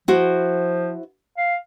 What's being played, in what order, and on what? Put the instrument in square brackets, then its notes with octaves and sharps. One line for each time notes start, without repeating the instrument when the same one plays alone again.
[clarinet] F3 [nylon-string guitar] E4 F#4 C5
[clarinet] F5